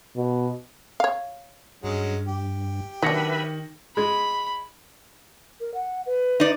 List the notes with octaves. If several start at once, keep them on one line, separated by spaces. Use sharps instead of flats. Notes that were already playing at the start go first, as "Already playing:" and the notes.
B2
C#5 F5
G2 F#3 G#3 C#4
G4
D#3 F#3 D4 B4 E5 B5 A#6 C#7
G#3 B5
A#4
F#5
B4
D#4 D5